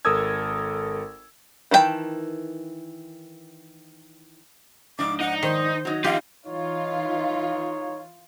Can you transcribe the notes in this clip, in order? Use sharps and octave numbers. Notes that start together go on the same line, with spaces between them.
G#1 A4 A#4 D#6 E6 G#6
D#3 E3 C#4 G5 A5
G#2 F3 D4 D6
D#4 F#5
D#3 C5
F#3 D#4
F3 D#4 F4 G4 F5 F#5
E3 D#4 F4 C#5